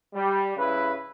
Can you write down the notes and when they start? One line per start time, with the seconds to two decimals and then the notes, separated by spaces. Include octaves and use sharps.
0.14 G3
0.56 G2 C#3 E4 B4